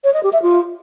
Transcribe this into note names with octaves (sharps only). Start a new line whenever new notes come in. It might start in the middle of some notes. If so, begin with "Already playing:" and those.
C#5
D#5
G4
E5
F4